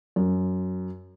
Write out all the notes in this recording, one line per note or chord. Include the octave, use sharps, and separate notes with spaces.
F#2